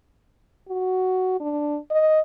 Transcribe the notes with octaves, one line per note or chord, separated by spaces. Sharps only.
F#4
D4
D#5